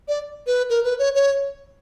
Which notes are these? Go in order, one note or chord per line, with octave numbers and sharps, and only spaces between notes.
D5
B4
A#4
B4
C#5
C#5